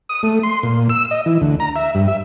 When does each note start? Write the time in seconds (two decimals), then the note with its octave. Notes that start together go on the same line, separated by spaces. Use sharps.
0.09 D#6
0.23 A3
0.43 C6
0.63 A#2
0.90 E6
1.11 D#5
1.26 E3
1.41 D2
1.60 A#5
1.76 E5
1.95 G2
2.08 E5